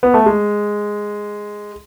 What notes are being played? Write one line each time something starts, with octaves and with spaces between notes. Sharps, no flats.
B3
A3
G#3